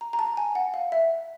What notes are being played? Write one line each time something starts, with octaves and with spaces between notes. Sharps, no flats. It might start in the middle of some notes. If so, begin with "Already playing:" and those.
A#5
A#5
A5
G#5
F#5
F5
E5